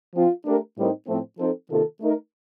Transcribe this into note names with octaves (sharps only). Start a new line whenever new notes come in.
F3 C4 F4
A3 D4 G4 A#4
A2 G3 C4 D#4 A#4
A2 F3 A3 C4
F3 C4 D#4 A4
C3 D#3 A#3 F4 A4
A3 D#4 A#4